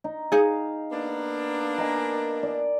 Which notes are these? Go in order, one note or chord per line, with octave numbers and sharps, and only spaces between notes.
D#4
D#4 G#4 F5
A#3 B3 D4
A#4 D#5 G#5
D5